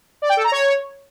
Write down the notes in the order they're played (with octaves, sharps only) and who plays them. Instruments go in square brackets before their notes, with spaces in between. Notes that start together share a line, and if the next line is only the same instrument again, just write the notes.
[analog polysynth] D5
G5
A4
A#5
C#5